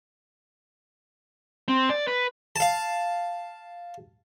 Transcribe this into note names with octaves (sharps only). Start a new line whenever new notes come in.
C4
D5
B4
F5 A5